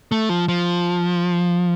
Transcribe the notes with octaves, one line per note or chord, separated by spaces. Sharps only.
A3
F3
F3